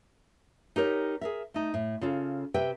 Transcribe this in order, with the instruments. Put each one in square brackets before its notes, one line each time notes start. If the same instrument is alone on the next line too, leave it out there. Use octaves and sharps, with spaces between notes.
[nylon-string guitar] D#4 G4 A#4 C#5
G#4 A#4 E5
A3 D#4
A2
C#3 F4 A4
C3 G4 B4 E5 G5